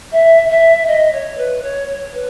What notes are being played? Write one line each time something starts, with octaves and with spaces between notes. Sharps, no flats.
E5
E5
D#5
C#5
B4
C#5
C#5
B4